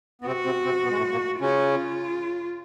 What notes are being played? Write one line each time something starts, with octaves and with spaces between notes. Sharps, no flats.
B3
C3 C4 F#4
C3 C4
C3 C4
B2 B3
G#3
A2 A3
A#2 A#3
C#3 C#4 F4